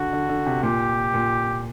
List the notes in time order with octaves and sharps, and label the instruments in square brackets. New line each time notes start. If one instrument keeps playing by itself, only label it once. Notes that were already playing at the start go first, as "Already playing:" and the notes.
Already playing: [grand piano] D3 [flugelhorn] F#4
[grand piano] D3
D3
C3
[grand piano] A#2 [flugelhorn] G4
[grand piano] A#2